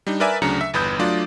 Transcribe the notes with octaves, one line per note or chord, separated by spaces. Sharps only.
G3 D4 D#4
A#4 B4 D5 E5 G#5
D2 C#3 F#3 D4 A#5 C#7
E5
G1 E2 B4 D#6 G6
F#3 A3 D4 F4 D5